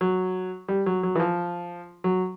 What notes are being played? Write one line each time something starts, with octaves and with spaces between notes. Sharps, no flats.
F#3
G3
F#3
F#3
E3
F3
F#3